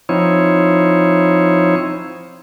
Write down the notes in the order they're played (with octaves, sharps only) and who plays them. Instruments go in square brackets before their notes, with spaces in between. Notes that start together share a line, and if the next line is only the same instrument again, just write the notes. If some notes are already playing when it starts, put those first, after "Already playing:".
[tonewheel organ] F3 C4 D#4 E4 C#5